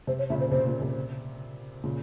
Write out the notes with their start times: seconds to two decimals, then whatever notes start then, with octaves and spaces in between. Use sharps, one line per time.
0.07 C3 C5
0.18 C#5
0.30 A#2 C#3 E5
0.40 C5
0.52 C3 C5
0.67 A#2
0.82 C3
1.84 A#2 C#3